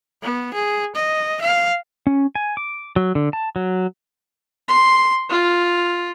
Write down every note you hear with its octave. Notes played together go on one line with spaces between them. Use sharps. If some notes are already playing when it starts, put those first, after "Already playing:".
B3
G#4
D#5
F5
C#4
G#5
D6
F#3
D3
A5
F#3
C6
F4